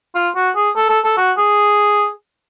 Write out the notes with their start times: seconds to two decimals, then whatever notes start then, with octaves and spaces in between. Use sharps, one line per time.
0.15 F4
0.35 F#4
0.56 G#4
0.76 A4
0.90 A4
1.04 A4
1.17 F#4
1.37 G#4